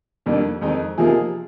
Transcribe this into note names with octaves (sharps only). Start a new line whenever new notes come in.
F2 D#3 G3 A#3 D4
F2 D#3 G#3 C4 D#4
C3 F3 A#3 D#4 F4 G#4